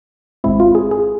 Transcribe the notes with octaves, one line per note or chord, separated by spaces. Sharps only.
G#1 G#2 G#3 C4 E4
F4
G#4
G#4